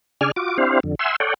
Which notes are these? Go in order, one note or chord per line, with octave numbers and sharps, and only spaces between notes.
C#3 D4 G#4 D5 G#5 F6
F4 F#4 D6
C4 D4 E4 G4 C5 F5
F2 D3
E5 F#5 G#5 C6 E6
A4 C#5 D5 F#5 G5